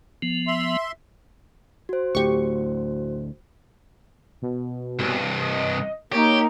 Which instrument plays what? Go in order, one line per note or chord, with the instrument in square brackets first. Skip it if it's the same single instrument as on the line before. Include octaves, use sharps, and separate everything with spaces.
[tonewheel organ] F3 B3
[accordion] E5 C6
[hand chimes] F#4 C5
[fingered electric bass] D2 A2 [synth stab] G4 C#6
[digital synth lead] B2
[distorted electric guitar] C2 G2
[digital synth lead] D#5
[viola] A#3 D#4 [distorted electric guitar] G4 [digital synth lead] C#5